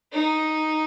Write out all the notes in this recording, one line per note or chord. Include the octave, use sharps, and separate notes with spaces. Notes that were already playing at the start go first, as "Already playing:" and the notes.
D#4